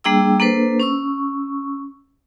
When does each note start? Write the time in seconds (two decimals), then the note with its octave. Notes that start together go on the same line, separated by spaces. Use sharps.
0.04 G3 A#3 D4 G#4 G5 E6
0.40 A#3 D4 A4 B4 C5
0.80 C#4 C#6 E6